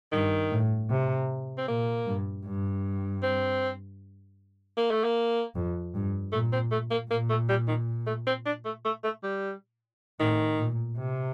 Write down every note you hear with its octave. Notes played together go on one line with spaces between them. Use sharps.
G2 D#3
A2
C3
C4
A#2 A#3
G2
G2
C4
A#3
A3
A#3
F2
G2
A#2 A3
C4
A3
A#3
A#2 A#3
A3
G3
D#3
A3
C4
D4
A3
A3
A3
G3
A2 D#3
A#2
C3